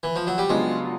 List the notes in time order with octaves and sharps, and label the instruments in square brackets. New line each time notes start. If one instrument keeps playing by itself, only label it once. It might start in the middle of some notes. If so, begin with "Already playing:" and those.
[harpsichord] E3
F3
F#3
G3
[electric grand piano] C#3 F#3 B3 D4 F4 [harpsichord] G#3